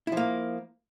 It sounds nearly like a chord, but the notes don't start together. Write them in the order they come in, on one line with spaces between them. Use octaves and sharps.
E4 F3 A#3